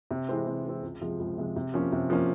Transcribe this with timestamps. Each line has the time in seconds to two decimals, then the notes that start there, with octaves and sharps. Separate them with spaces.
0.11 C3
0.29 E3 G#3 C4
0.47 C3
0.65 E3 G#3 C4
0.83 C#2
1.01 C3 F3 G#3
1.19 C#2
1.38 C3 F3 G#3
1.56 C3
1.74 F3 A#3 C#4
1.92 C3
2.10 F3 A#3 C#4